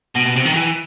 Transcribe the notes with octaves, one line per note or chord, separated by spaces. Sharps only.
B2
B2
C3
D#3
E3